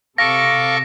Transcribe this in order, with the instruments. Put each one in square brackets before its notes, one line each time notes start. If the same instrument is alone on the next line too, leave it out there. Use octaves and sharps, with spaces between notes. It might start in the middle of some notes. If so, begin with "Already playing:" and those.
[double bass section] C3 [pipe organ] A4 C#6 D6 [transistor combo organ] F5 [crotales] A#6